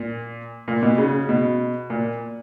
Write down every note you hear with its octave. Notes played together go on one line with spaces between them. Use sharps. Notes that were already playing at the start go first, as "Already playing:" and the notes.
Already playing: A#2
A#2
B2
C#3
B2
A#2